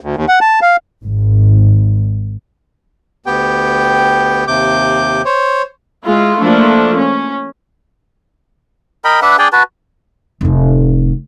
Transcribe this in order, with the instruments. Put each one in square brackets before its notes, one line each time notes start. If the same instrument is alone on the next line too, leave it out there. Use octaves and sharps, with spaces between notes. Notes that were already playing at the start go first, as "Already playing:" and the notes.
[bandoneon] D2
D#2
F#5
A5
F5
[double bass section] G#1
[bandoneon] D2 B3 G4 G5
D#2 C3 D6 G6
C5 C#5
[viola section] G#3 E4 F4
F3 A3 A#3 D4 E4
C#4
[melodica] A#4 D#5 G5 B5
D4 B4 E5 F#5
D4 G#4 G5 A5
F#4 B4 A5
[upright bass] F1 A2